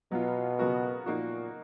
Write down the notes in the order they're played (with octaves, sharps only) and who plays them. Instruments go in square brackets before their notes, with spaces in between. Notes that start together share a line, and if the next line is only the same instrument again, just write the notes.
[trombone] B2 [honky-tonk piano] F#3 B3 F4
[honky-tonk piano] C#3 F#3 B3 F#4 A#4
[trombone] A#2 [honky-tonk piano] F3 A#3 D#4 F#4